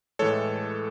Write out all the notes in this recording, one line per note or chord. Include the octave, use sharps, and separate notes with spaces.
A2 E3 G#3 A4 C#5